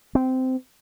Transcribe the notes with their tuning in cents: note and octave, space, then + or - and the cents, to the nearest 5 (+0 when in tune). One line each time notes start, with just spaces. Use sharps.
C4 -15